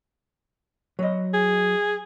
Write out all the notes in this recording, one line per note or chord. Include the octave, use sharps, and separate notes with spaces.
F#3 D#5
G#4